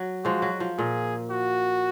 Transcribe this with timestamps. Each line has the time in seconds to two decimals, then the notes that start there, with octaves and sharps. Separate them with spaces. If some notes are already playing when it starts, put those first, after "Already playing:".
Already playing: F#3
0.24 F3 G#3 F#4
0.42 F#3
0.60 F3
0.78 A#2 G#4
1.31 F#4